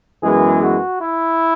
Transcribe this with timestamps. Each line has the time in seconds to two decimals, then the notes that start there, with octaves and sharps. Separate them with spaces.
0.22 F#2 E3 G#3 B3 G#4
0.62 F#4
1.01 E4